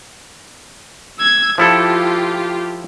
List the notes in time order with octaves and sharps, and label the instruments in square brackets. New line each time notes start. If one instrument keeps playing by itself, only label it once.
[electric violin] E6 G#6
[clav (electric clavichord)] F3 E4 A4 [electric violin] F4 G4